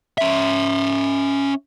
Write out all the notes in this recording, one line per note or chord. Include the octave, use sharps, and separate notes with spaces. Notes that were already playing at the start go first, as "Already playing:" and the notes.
C#4 E5